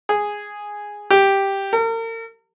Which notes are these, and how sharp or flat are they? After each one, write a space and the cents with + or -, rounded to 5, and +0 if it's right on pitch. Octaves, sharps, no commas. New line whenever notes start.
G#4 -5
G4 +0
A#4 -40